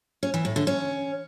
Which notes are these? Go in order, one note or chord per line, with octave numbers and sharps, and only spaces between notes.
C#4
E3
A2
D3
C#4